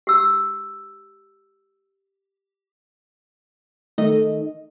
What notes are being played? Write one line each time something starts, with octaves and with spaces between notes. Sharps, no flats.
G4 E6
D#3 A3 D#5